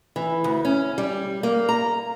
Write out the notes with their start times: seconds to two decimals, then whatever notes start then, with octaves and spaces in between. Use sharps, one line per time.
0.16 E3
0.44 D2
0.65 C#4
0.98 G3
1.43 A#3
1.69 A#5